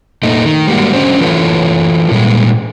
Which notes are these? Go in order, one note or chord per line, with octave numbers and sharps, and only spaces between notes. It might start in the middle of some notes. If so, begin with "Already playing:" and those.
A#2 A3 D#4
D#3
G3 G#3 A#3 F#4
D3 F#3 C#4 C5
E3 F4 A4 B4 C#5
A#2 G3 G#3